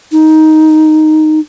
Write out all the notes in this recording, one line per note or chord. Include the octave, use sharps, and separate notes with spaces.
D#4